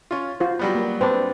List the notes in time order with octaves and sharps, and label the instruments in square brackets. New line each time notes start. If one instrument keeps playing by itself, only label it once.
[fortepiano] C#4 F4
[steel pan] F4 C5 [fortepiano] F#4
[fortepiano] F#3 G3 B3
[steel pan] A#3
[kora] C4 D4 [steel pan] B4